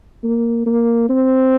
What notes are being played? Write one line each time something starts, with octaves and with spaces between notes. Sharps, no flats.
A#3
A#3
C4